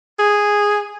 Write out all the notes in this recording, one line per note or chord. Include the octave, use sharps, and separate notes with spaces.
G#4